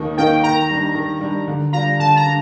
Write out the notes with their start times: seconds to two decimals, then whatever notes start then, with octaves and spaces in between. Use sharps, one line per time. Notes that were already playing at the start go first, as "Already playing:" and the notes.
Already playing: D#2 D#3 A#3 D#4
0.17 D#3 A#3 D#4 A#4 G5
0.43 D#3 A#5
0.69 G3 D4
0.95 D#3
1.21 G3 D4
1.48 D3
1.73 G3 D4 F4 A#5
1.99 D3 A5
2.17 A#5
2.25 G3 D4